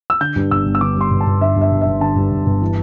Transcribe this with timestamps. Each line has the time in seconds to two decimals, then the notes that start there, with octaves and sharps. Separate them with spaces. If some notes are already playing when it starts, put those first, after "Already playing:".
0.10 E6
0.21 D3 G6
0.36 G2
0.51 G1 E6
0.65 G1
0.75 E6
0.81 D3 D6
0.96 G2 C6
1.11 G1
1.21 A5
1.26 G1
1.41 D3 E5
1.56 G2
1.61 E5
1.71 G1
1.81 G1 E5
2.01 D3 A5
2.16 G2
2.31 G1
2.46 G1
2.61 E3